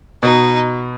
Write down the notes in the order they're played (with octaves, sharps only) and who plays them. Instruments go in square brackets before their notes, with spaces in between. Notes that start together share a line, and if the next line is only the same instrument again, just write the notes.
[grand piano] B2 [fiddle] D#4